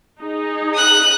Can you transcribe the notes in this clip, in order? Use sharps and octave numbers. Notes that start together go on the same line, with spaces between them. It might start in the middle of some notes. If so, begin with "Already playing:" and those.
D#4 G#4
D#6 F#6